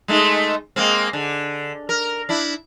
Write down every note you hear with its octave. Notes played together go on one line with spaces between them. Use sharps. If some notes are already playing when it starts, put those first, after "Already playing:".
G#3 A3 D#4
G#3 A#3 C4
D3
A#4
D4 E4